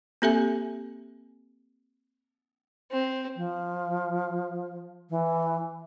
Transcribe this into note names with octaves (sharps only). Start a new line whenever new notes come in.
A#3 C4 G4 A4 E5 G#5
C4
F3
E3